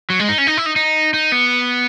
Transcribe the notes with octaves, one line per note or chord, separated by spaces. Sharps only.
F#3
G#3
D#4
C#4
D#4
E4
D#4
D#4
D#4
B3